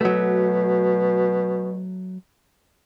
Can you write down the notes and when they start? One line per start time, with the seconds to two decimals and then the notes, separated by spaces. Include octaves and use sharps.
0.01 B2 F#3 A3